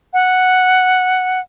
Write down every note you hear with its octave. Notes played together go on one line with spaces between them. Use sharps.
F#5